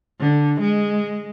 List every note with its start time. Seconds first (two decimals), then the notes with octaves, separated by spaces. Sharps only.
0.20 D3
0.61 G#3